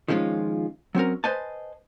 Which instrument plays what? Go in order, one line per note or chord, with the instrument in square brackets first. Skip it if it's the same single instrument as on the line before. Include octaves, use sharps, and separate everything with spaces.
[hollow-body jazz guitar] D#3 F3 G#3 C#4 F4
F#3 C4 C#4 A#4
B4 C5 D#5 G#5 A5